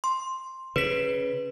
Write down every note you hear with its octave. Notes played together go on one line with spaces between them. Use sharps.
C6
C#3 B4 B6